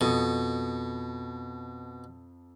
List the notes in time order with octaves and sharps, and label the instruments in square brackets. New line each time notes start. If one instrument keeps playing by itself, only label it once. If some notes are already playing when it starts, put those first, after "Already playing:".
[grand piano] F2 A4 D#6 [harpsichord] B2